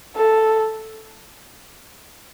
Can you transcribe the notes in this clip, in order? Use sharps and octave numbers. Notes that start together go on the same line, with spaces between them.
A4